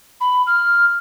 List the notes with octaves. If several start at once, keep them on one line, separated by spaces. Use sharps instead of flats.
B5
F6